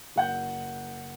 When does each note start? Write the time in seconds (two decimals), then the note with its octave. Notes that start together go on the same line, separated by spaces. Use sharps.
0.16 F#1 F#5 G6